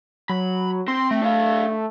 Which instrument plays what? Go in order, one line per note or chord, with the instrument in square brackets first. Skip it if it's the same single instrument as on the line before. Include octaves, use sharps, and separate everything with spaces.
[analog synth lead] F#3 [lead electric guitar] B5
[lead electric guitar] C4 [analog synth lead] C6
[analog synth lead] A3
[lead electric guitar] D4 F5